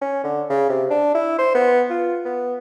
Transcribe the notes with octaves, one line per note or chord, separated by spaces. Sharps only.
C#4
D3
C#3
C3
D4
E4
C5
B3
F4
B3